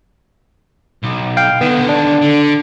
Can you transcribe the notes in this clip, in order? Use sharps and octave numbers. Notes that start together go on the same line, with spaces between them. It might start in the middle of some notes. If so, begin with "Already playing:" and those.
B1
F5 G5
D3 D#3 B3
D4
D3